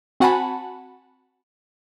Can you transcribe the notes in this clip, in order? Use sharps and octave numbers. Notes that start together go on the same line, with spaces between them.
C4 F#4 F#5 G#5 A5 B5